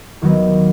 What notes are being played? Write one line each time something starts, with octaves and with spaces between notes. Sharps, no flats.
D#2 D#3 F#3 B3